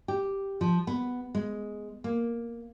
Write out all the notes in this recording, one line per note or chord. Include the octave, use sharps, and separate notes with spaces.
G4
F3
B3
G#3
A#3